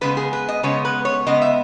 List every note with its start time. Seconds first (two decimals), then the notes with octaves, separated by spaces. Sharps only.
0.01 C#3 G#3 B3 B4
0.17 G#4
0.33 B4
0.48 D#5
0.63 C#3 G#3 B3 C#5
0.85 B4
1.05 C#5
1.26 C#3 G#3 B3 D#5
1.42 E5